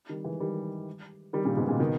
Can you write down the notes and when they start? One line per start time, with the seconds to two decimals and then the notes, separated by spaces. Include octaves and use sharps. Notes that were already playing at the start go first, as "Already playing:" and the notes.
0.09 D#3 G3
0.24 E3 G#3
0.40 D#3 G3
1.33 D#3 G3
1.45 A#2 C#3
1.57 G#2 B2
1.68 A#2 C#3
1.79 B2 D#3